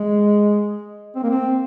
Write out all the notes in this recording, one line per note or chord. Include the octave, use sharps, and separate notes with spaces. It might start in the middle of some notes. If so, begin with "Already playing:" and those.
Already playing: G#3
C4
A#3
C4